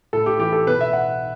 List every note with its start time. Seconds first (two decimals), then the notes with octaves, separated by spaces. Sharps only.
0.13 A2 A4
0.26 G4
0.39 E3 G4
0.53 A4
0.67 B2 B4
0.81 E5
0.93 F#5